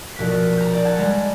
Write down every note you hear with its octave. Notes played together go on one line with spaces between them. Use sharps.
A#1 B2 A#3 F#6 B6
A#5 G6
D5
F#5 A5 A#5 F#6 G#6
G3 G#3 A5 A#5